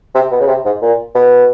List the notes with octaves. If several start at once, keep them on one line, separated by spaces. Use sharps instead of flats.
C3
B2
C#3
C3
G#2
A#2
B2